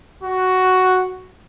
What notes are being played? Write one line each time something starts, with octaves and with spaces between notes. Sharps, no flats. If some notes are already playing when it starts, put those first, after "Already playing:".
F#4